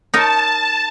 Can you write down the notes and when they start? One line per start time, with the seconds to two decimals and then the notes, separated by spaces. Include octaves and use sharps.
0.14 D#4 A#4 C#5 A5